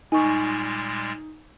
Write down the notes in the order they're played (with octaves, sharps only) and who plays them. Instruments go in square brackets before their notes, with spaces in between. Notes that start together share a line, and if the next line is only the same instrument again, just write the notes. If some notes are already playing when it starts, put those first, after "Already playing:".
[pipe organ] A#2 G3 G#3 [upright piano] D#4 [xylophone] G#5 C#6